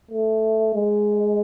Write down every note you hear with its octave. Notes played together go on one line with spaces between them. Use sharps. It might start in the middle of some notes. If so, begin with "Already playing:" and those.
A3
G#3